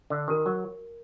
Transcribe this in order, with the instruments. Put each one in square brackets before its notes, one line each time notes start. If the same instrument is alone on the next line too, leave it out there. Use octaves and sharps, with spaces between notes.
[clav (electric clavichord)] D3
[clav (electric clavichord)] D#3 [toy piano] D4 F#4 A#4
[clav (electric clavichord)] F#3